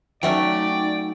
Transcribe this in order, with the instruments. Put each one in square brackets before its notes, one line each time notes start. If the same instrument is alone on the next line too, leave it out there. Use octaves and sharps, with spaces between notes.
[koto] F#3 A3 C#4 [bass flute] D#4 [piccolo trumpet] D5 [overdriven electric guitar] G5